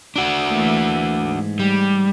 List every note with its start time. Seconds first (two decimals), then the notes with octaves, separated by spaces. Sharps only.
0.16 D4 F#4
0.48 E3 A3 A#3
1.22 G#2
1.59 G3